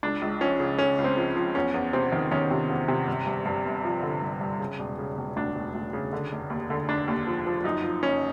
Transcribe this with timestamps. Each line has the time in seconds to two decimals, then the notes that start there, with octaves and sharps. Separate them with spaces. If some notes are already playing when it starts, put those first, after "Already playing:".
0.03 C#2 D4
0.22 C#2
0.41 F3 C#4
0.60 C#3
0.78 C#3 C#4
0.98 C#2
1.04 C4
1.17 F3
1.36 F3
1.55 E2 C#4
1.74 E2
1.93 C3 C4
2.12 D#3
2.31 D#3 C#4
2.51 C3
2.70 E2
2.88 C3
3.08 G1
3.27 G2
3.46 G2
3.65 G1
3.84 F3
4.03 D3
4.22 G2
4.41 G2
4.60 C#3
4.79 E1
4.98 C#3
5.18 E1
5.37 D2 D4
5.55 E1
5.74 D2
5.93 C#3
6.13 D3
6.32 F1
6.50 D#2
6.70 D3
6.88 F1 D4
7.08 D#2
7.27 F3
7.46 F3
7.64 F#2 D#4
7.84 F3
8.03 F#1 C#4